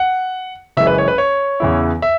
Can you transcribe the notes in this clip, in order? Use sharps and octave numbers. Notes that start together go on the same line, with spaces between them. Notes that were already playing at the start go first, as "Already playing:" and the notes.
Already playing: F#5
F#1 F#2 E3 G#3 C#4 E5
B4
C#5
B4
C#5
E2 C#3 E3 B3 E4
E5